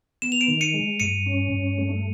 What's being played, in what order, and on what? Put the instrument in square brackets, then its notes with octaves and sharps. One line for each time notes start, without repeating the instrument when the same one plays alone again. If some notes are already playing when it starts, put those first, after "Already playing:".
[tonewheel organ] B3 [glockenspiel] E7
[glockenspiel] F7
D7 E7
[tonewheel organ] D#3
[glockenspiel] C#7 D#7
[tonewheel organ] G#3
[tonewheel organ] G2 [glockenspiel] C#7 D#7
[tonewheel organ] C#4
G2
A3